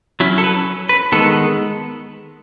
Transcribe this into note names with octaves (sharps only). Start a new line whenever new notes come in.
F#3 C#4 E4
A4
B4
B4
D#3 G#3 B3 A4